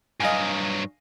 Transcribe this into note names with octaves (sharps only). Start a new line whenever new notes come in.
G2 F#3 D#5 F5 G#5